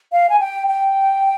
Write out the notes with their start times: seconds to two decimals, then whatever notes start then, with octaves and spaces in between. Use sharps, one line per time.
0.12 F5
0.29 G#5
0.40 G5
0.67 G5